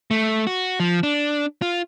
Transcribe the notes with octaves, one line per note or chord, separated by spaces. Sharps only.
A3
F#4
F3
D4
F4